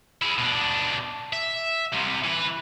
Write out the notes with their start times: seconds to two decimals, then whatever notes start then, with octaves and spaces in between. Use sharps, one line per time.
0.22 E4 G#4
0.38 B2 D4
1.33 E5
1.93 C2 C3
2.24 E3 B4